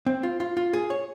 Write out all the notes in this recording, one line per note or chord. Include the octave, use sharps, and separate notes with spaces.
C4
F4
F4
F4
G#4
C#5